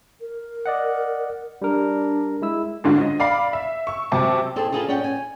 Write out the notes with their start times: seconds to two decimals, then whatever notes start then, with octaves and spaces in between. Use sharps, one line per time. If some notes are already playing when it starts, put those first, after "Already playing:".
0.21 A#4
0.66 D5 D#5 F#5
1.62 G3 D4 A#4
2.42 G#3 E4 E6
2.84 G#2 D3 C#4 D4 F4 F#4
3.01 D#5
3.20 D5 F5 B5 C7
3.53 E5
3.87 C#6 E6
4.12 F#2 C3 E5 A5 C#6
4.56 E2 C4 G#4 A4
4.72 D#4 F4 G#4 A4 B4
4.88 C#4 D5 F#5 G5
5.04 G#5